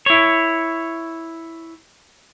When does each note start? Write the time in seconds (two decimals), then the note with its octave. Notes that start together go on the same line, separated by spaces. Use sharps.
0.06 E4 C#5